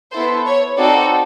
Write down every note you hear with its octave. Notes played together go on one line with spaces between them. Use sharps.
B3 E4 A4 C5
C#5
C4 D#4 F#4 A4 D5